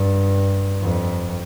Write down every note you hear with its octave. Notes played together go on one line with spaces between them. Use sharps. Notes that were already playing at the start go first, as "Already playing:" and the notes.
Already playing: G2
F2